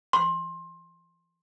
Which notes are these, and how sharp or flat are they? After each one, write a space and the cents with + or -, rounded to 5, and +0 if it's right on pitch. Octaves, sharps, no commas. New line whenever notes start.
C6 +25